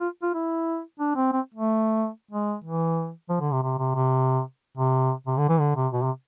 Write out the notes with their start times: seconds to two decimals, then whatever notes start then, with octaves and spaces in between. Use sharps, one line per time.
0.01 F4
0.23 F4
0.34 E4
1.00 D4
1.16 C4
1.33 C4
1.55 A3
2.31 G#3
2.64 E3
3.29 F3
3.41 D3
3.52 C3
3.63 C3
3.79 C3
3.95 C3
4.78 C3
5.27 C3
5.38 D3
5.49 E3
5.60 D3
5.76 C3
5.93 B2
6.03 C3